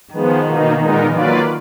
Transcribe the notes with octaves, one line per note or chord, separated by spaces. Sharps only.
D#3 F3 G#3 B3
B2 A#3 D#4
A#2 G#3 B3 D#4 A#4
D#3 F#3 A#3 F4 B4 D5